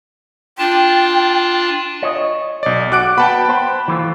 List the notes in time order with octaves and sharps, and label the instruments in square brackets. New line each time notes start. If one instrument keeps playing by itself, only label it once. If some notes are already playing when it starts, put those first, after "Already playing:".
[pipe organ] D4 F4 A5 [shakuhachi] G5
[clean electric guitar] C#5 D#5
[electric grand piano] B1 D5
[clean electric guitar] F#4 [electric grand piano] D6 F#6 D7
[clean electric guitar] B3 [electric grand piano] G5 A5 B5
[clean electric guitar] C5
E3 A3 F4